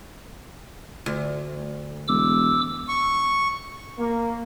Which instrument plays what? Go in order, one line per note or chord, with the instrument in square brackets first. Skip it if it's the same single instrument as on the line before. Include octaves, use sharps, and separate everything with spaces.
[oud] D2
[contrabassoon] E1 [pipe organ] D6 E6
[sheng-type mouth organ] C#6
[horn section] A#3